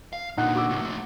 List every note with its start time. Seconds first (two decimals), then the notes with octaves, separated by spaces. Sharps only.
0.13 F5
0.38 A#2 D3 D#4 F#5
0.56 F#4 D6 E6
0.70 C#2 A2
0.81 A3 C4